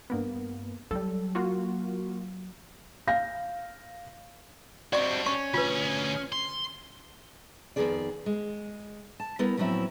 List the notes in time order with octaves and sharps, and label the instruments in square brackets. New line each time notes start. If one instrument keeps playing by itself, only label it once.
[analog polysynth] G2 A#3 B3
[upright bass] F#3 [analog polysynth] G3 A4
[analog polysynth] A#3 F4 F#4
[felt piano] F5 A#6
[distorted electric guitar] G3 D4 [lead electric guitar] C4 F#4 [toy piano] D5 C#6
[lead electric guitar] C#4 [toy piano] C#6
[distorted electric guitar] D2 G#4 [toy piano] F4 B4
[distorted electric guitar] C6
[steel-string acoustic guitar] F2 A#2 D#3 B3 G#4 D5
G#3
A5
G3 B3 E4 A#4
A2 F3 F#3 C4 E4